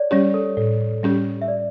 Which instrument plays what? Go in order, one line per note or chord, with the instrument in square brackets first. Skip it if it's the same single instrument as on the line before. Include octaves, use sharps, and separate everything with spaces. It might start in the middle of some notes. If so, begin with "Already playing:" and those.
Already playing: [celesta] C#5 D5
[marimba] G3 C#4 G4 [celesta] C#5
[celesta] A4
[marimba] A2
G3 C#4 G4
[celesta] E5
D5